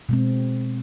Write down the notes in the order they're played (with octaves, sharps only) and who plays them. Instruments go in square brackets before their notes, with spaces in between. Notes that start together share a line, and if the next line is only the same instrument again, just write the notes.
[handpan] B2 G#3 C4